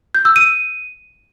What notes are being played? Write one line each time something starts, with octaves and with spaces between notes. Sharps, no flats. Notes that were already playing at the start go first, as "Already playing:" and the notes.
G6
E6
D#7